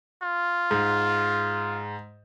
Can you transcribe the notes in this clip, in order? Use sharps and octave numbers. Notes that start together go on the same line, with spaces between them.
F4
G#2